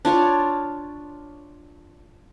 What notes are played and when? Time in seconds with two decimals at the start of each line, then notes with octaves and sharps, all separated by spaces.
0.05 D4 F4 C#5